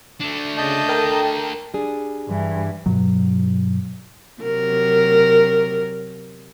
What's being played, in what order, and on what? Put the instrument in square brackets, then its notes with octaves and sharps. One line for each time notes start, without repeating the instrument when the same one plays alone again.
[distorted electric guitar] A3 D4
[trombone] C#3 [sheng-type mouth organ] D#5 A5 G6
[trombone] A4 [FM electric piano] A#4 G5 A#5
[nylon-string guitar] G3 D4 G#4
[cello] G2 E3
[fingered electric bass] G2 B2 F#3
[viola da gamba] C3 F#3 A#4